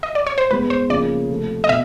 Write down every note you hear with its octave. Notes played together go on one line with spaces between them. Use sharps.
D#5
D5
C#5
C5
G#2 E3 G#3 B3 B4
C5
C#3 F3 A#3 D5
C3 F3 A3
D#5
B2 E5